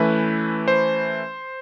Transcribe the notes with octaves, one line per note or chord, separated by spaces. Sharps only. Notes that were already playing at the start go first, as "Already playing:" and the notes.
Already playing: E3 A3 C#4 E4 B4
C5